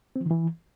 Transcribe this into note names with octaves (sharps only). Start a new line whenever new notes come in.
C4
F3
D#3
E3